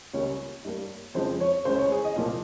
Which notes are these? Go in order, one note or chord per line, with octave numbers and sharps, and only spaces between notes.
C#2 C#3 G3 A#3 C#5
G2 G3 A#3
F2 C#3 F3 G#3 C5
C#5
C#2 C#3 G#3 C5
C#5
G#4
D#5
C2 A#2 F3 A#3